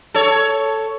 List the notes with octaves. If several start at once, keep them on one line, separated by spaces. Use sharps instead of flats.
A4 C#5